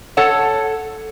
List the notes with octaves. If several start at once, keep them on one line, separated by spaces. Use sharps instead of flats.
A4 C#5 F#5 A5